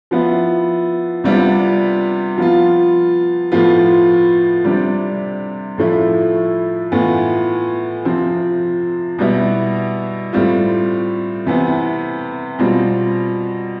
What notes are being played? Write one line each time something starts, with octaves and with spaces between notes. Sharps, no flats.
F3 B3 E4
C3 G3 B3 D4 F4
F3 B3 F4
A2 F3 B3 F4
C3 G3 D4
A2 F3 A3 E4
A2 E3 B3 F4
C3 F3 C4
B2 G3 B3 E4
A2 G3 C4 F4
C3 E3 B3
B2 G3 C4 F4